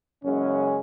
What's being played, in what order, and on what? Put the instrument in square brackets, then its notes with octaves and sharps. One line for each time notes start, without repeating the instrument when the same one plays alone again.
[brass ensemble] F#1 F#2 C#3 G#3 C#4